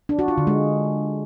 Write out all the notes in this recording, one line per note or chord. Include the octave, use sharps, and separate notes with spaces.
D4
F#4
F4
D3
G#3